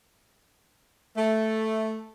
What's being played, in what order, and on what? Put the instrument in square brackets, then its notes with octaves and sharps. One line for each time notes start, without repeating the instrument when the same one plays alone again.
[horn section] A3